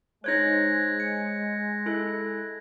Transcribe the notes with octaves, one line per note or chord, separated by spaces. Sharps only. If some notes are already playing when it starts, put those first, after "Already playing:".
G#3 D#4 C5 C#5 F#6 G#6 A#6
C#7
E4 A4 F#6